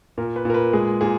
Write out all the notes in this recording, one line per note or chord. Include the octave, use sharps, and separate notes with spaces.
A#2 A#4
B4
A#2 A#4
B4
G#3 G#4
A#2 G#4